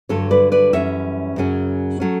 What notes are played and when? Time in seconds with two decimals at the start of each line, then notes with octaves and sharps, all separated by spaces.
0.09 G2 D3 F#3 A4 C#5
0.31 B4 D5
0.52 B4 D5
0.73 F#2 E3 G3 C#4 C#5 E5
1.36 F#2 C#3 F#3 C#4
2.00 F#3 A3 C#4